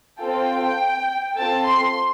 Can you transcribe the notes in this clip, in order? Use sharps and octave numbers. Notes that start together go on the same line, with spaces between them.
C4 F4 A4 G5
C4 F4 A4 A5
C6